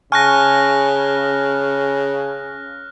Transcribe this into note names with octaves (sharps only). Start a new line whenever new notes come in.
C#3 G#5 A5 C#6 F6 F#6 A#6